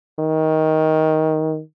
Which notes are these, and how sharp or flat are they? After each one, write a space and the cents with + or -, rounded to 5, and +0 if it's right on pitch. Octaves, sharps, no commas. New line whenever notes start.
D#3 +15